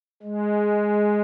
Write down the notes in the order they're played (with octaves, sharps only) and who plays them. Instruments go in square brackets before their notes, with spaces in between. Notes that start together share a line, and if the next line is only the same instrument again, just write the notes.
[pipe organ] G#3